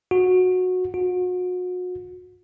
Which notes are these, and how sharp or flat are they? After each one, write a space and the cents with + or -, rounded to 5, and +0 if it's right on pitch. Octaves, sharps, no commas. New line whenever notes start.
F#4 -15
F#4 -35